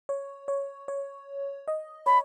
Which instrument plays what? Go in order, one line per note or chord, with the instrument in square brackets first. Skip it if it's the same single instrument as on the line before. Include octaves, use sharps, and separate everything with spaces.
[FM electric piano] C#5
C#5
C#5
D#5
[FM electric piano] C#5 [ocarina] B5